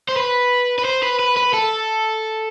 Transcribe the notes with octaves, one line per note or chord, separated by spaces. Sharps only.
C5
B4
B4
C5
B4
B4
B4
A4